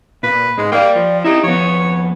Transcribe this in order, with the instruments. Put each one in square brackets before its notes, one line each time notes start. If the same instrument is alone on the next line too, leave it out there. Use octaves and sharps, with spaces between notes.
[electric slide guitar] A#2 [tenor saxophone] B4
[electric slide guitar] G#2 [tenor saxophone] G#3
[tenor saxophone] A#3 [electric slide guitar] D5 G5
[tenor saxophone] F3
[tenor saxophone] D#4 [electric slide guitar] E4 G4
[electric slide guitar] F2 B3 [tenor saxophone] C#5